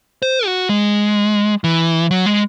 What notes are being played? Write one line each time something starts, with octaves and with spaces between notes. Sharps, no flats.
C5
F#4
G#3
E3
F#3
G#3